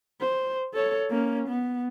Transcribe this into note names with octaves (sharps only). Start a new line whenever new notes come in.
C5
A4 C#5
A#3 C#4
B3